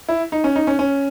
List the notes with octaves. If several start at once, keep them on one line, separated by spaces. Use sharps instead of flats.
E4
D#4
C#4
D#4
C#4
C#4